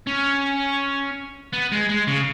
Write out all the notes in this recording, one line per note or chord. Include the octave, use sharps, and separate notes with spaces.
C#4
B3
G#3
G#3
C#3